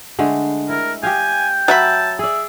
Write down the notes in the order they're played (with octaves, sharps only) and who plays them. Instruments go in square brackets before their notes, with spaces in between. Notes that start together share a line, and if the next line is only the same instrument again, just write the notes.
[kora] D3 G#3 A3
[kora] E4 [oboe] A#4
[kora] G4 D#5 F5 [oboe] G5 [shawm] G#5
[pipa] F#3 E5 B5 [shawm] A5
[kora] G#4 D5 [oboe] E5